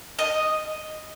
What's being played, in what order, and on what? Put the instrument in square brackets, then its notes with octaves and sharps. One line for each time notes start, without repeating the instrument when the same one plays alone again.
[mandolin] D#5